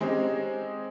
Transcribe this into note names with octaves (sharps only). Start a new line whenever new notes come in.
G#3 C4 C#4 D#4 G4